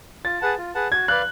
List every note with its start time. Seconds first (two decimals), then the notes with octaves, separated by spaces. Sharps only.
0.25 F4 A6
0.41 G#4 B4 F#5 A5
0.58 F4
0.75 G#4 B4 F#5 A5
0.92 F#4 G#6
1.08 B4 D5 F5 F#6